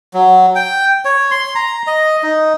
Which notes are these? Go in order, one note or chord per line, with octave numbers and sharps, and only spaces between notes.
F#3
G5
C#5
C6
A#5
D#5
D#4